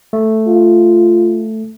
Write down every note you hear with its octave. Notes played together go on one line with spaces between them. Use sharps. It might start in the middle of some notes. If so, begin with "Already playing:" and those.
A3
F4